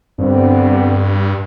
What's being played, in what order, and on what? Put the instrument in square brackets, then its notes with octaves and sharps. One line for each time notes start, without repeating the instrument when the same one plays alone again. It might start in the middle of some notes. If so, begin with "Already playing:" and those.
[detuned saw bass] G2 [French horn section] D3 B3 C4